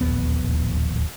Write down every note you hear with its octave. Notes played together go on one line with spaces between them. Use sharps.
D1 A#1 D#2 B3